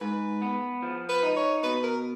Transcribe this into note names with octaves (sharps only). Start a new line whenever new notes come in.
G#2 B4
B3
F3
B4
D#4
C#5
B2 B4
A#4